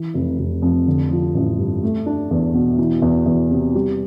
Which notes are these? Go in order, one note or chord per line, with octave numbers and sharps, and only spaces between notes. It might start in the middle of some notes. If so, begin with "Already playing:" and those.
Already playing: E3
F1
F1
F2
D3
F3
A1
G2
A3
D4
E2
B2
E3
E2
E2
C3
G3